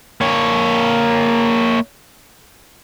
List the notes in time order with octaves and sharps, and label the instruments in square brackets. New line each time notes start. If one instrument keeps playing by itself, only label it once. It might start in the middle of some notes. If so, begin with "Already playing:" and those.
[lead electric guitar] A#3 C#5